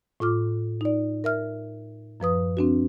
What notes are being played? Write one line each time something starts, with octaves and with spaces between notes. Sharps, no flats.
A2 F4 D6 F6
D#4 D5
A#4 E5 F6
F#2 F3 B4 D#6
C4 D4 F#4